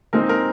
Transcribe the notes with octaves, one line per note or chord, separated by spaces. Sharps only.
A#2 G#3 C4 D#4 A#4
A#4